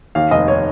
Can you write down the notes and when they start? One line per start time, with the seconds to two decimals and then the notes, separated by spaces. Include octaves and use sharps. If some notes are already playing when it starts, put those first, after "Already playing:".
0.15 D#2 F5
0.31 F1 D#5
0.48 C#5